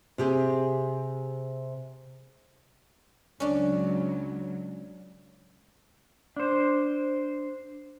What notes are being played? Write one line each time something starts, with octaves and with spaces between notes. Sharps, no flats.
C3 G4 G#4
C#2 F#3 C#4 D4
D4 C5